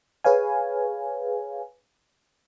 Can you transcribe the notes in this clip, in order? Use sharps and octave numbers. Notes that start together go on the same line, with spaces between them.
G#4 B4 C#5 F5 G#5